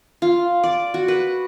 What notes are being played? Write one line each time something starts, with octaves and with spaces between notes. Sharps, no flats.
F4
D5
F#4
B4